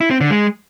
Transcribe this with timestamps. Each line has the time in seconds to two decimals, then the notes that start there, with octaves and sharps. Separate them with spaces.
0.01 E4
0.11 C4
0.21 D3
0.31 G#3